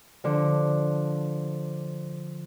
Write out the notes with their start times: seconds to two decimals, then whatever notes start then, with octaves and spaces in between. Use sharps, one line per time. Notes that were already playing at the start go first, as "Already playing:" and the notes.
0.24 D3 F3